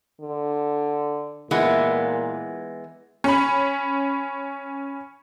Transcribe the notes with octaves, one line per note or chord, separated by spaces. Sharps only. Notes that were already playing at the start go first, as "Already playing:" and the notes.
D3
A#2 E3 G#3 B3
C#4 B5